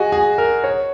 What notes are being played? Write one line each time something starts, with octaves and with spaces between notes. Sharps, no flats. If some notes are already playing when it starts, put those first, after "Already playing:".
Already playing: F#4 G#4 D#5
G#4
A#4
C#5